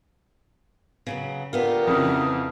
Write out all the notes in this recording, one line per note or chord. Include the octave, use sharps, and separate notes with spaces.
C#3 F#3 B3
D3 A3 B3 F4 G4 A#4
F2 C#3 E4 D#6 F6